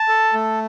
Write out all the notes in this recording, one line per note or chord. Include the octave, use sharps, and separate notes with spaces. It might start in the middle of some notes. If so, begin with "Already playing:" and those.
Already playing: A5
A4
A3